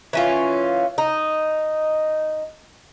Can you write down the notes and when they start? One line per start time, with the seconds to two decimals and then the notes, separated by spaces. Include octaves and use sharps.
0.13 E3 C#4 F4
0.98 D#4